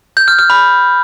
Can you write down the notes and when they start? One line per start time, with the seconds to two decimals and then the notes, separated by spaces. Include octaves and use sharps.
0.17 G6
0.28 F6
0.39 F6
0.50 B5